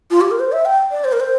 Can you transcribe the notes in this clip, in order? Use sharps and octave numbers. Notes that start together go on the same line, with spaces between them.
F4
G4
A#4
C5
E5
G5
D5
C5
A#4
C5